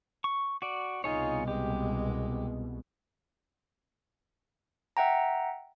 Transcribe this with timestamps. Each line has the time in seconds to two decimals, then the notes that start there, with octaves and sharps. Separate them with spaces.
0.24 C#6
0.62 F#4 D5
1.04 C2 B2 D#4 F4 G#4 C#5
1.48 G#3 G4
4.97 E5 F#5 G5 A#5